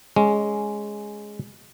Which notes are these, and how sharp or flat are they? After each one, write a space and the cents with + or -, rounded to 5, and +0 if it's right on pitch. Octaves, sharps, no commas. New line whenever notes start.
G#3 +0 C#4 +5